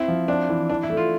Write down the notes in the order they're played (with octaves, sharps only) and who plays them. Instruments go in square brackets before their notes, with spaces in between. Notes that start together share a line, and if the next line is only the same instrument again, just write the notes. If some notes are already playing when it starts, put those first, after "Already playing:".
Already playing: [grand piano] C4 [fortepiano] E4
[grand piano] F3
[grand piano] C4 [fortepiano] D4
[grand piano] E3
[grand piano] E3 [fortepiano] D4
[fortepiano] E4
[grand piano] A3
[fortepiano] F4